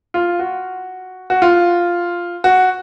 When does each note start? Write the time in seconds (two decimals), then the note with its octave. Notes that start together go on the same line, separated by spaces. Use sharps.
0.14 F4
0.39 F#4
1.30 F#4
1.42 F4
2.44 F#4